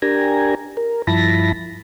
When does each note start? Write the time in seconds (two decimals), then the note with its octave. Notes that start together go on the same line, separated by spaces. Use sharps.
0.02 D4 G4 A#4 G#5 A#5
0.77 A#4
1.07 G2 F3 E4 A5 B5 A#6